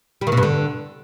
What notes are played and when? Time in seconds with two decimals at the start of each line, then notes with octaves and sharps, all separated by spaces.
0.21 G3
0.27 D#3
0.32 B2
0.37 G2
0.43 D3